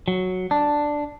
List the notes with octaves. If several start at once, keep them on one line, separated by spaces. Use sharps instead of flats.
F#3
D4